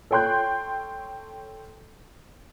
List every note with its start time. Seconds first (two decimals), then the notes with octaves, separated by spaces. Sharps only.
0.11 A4 C#5 G5 C6 F#6 G6